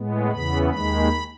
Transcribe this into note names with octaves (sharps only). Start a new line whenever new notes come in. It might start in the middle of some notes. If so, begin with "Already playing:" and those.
Already playing: A2 G#3 B3
E2 C#3 E3 B3 B5
D#2 D#3 G#3 B5